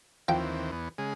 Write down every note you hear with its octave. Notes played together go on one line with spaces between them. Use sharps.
D#2 E3 F3 C4 G5
E2 B3
C#3 G#3 G#4